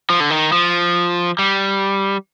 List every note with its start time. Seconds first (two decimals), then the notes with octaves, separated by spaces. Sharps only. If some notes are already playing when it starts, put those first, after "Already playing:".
0.10 F3
0.20 D3
0.30 D#3
0.52 F3
1.39 G3